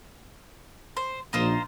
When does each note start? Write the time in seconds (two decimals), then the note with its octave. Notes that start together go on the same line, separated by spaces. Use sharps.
0.97 C5
1.33 A#1 D#4 F4 C5